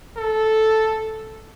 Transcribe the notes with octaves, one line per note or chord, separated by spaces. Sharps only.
A4